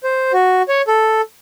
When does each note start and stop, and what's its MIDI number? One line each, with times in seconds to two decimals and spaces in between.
0.04 0.32 72
0.33 0.62 66
0.68 0.82 73
0.88 1.21 69